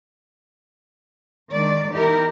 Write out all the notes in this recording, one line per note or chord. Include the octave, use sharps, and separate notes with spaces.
D#3 G#3 D4 D5
E2 D#4 E4 G4 A#4